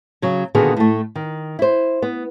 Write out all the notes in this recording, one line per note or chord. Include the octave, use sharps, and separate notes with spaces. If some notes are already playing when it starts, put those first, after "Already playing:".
C#3 F#3
A#2 D3 D#3 B3 F#4 G#4
A2 A3
D#3
E4 C5
B3